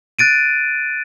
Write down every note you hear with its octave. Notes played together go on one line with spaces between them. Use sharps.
F#6 A6 D7 D#7